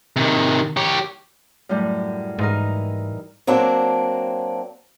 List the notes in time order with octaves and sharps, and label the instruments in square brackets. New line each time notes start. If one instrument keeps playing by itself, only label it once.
[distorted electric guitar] C3 D#3
G4 C#5
[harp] F#2 A2 G3
[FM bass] G#2 [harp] E3 D#4 A#4
[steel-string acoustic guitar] F#3 A#3 C4 D4